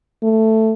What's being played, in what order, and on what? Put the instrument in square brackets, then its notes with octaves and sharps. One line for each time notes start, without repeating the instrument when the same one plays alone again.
[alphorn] A3